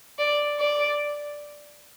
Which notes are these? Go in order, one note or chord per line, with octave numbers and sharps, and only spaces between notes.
D5
D5